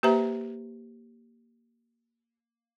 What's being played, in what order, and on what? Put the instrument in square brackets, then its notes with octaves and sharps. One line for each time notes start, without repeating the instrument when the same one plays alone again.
[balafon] A#3 G4 B4 C5 E5 A#5